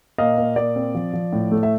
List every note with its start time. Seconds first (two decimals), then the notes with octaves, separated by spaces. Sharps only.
0.18 A#2 D#5 F5
0.38 A#2
0.56 A#2 D5
0.76 C4
0.95 F3
1.13 F3
1.33 A2
1.51 A3
1.63 E5